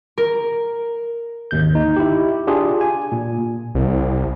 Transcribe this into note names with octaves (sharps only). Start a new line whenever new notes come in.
A#4
G#1 D#2 G6
D#4
E4 G4
D4 F4 G4 G#4
G#5
A#2
C2